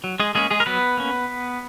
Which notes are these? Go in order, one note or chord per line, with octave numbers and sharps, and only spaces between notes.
F#3
G#3 G#4
G#3 A#3 C#4 G#4
G#3 G#4
A#4
F#3 B3 B4
A#3 C#4